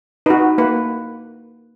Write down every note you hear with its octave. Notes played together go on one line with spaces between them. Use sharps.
D#4 F#4 B4
A#3 B4